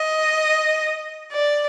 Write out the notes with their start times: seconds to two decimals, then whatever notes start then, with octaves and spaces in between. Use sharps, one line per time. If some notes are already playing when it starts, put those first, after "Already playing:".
Already playing: D#5
1.32 D5